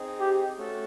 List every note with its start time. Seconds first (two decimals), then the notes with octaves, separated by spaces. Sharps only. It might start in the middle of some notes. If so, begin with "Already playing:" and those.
Already playing: C4 D#4 G#4
0.20 G4
0.58 A3 C#4 F#4 A4